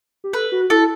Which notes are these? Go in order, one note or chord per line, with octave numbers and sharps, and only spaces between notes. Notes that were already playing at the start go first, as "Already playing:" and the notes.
G4
A4 B4
F#4
E4 A4